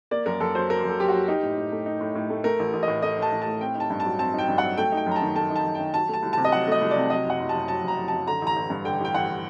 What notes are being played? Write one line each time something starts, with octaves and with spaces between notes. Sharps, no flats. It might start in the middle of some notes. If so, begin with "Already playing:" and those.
A#3 D5
F#2 A#4
F#2 A4
F#3 C5
A#3 A#4
F#2
A4
F#2 G4
F#4
F#3
D#4 G4
A2
A2
A3
D#4
A2
A2
A3
A3 A#4
A1
A1
D#5
A2
A3 D#5
A1 A5
A1
A5
A2
C4 G5
D#4 A5
G2
A5
F#3
C4 A5
D#4 G5
G2
F#5
F#3
A3 G5
D#4
G5
F#2 A#5
A5
D#3
A3 A5
D#4
A5
F#2
D#3 G5
F#3 A5
A3 A5
C2
C3 A5
D#5
F#3 F#5
A3 D#5
C2
C3 D5
F#3 D#5
F#1 F#5
F#1
A5
F#2
F#3 A5
F#1 A#5
F#1
F#2 A5
D3 A#5
A1
A#5
A1
G2
D3 G5
A1 G5
A1 F#5